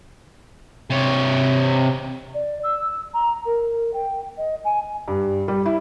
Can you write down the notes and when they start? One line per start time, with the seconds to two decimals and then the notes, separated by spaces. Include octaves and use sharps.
0.90 C3 C#5
2.34 D5
2.63 E6
3.13 A#5
3.45 A#4
3.93 G5
4.37 D#5
4.64 G#5
5.08 G2
5.48 G3
5.66 E4